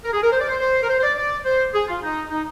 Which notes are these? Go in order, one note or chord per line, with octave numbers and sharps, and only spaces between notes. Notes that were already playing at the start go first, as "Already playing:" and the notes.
A#4
G#4
A#4
C5
D5
C5
C5
A#4
C5
C5
D5
D5
C5
G#4
F4
D#4
D#4